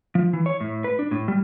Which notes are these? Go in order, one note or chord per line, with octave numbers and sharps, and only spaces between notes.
F3
E3
C#5
A2
B4
D4
A2
G3